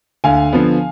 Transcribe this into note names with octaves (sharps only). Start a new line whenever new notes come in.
D2 F5 G#5
D3 F3 B3